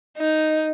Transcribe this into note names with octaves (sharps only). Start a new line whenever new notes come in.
D#4